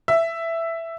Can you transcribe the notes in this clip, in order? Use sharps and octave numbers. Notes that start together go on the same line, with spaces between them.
E5